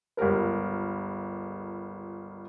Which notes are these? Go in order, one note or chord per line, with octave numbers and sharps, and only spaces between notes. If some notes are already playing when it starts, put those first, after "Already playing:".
G1 C#2 G3 A#4 B4